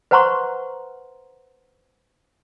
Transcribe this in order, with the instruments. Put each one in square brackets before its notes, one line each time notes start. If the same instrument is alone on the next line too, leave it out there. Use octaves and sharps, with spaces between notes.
[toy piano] B4 C5 F#5 A#5 C6 C#6